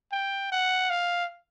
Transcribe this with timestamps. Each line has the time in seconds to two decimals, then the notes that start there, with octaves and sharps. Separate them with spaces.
0.12 G5
0.52 F#5
0.90 F5